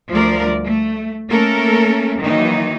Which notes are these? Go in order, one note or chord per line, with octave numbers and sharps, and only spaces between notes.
D2 F3 G3 A3 A#4 D5
A3
A3 A#3 C#4 A4 A#4
D#3 E3 F#3 A#3 D#4